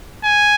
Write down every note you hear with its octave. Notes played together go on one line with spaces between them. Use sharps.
G#5